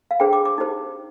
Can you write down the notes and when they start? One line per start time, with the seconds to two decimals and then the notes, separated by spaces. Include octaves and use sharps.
0.11 F5
0.20 D4 G#4 C5 G5
0.33 D6
0.45 D6
0.58 D#4 G4 C5